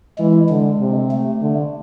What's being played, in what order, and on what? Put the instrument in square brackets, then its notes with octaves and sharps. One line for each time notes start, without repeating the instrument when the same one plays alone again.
[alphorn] E3 [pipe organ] G#3
[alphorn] D3 [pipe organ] G#3
[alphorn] C3
[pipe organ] A3
[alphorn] D3